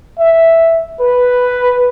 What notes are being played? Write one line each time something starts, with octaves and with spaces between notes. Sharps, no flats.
E5
B4